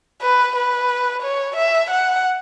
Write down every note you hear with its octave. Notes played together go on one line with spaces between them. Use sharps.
B4
B4
C#5
E5
F#5